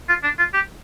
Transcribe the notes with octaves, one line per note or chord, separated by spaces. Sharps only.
F4
D4
F4
G4